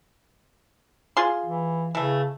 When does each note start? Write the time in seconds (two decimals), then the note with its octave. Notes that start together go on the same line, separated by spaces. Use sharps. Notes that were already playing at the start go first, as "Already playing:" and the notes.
1.17 F4 G#4 C6
1.46 E3
1.95 C#3 E3 A3